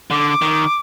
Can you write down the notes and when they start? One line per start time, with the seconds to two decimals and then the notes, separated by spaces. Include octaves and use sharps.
0.11 D3 D6
0.42 D#3